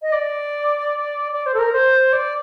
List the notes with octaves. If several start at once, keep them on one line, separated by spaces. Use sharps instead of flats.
D#5
D5
D5
C5
A4
A#4
C5
D5